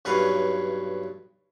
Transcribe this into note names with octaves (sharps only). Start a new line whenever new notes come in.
B1 G2 B4 C#5 F5